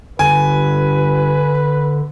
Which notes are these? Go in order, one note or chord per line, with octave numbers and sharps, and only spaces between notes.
G1 D3 B4 G#5